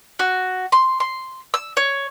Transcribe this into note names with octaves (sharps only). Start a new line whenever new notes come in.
F#4
C6
C6
E6
C#5